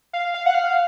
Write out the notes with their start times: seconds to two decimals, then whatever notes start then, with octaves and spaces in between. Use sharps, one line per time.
0.13 F5
0.34 F5
0.46 F#5
0.54 F5